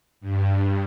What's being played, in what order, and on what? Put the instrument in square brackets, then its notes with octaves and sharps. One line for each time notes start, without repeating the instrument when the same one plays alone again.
[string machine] G2